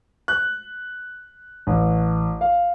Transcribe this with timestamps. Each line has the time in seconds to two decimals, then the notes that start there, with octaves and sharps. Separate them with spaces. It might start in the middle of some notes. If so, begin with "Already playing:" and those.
0.28 F#6
1.67 A1
2.41 F5